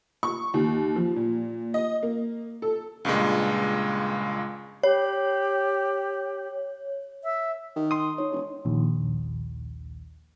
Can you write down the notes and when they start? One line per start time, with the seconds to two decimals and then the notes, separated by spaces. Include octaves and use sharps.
0.23 C#6
0.54 D#2
0.96 F3
1.16 A#2
1.74 D#5
2.03 A#3
2.62 A4
3.05 C#2 G2 A#2 G#3
4.83 G4 C#5
7.24 E5
7.76 D#3
7.91 C6 D#6
8.18 D#4 C#5
8.31 E1
8.65 A#1 D#2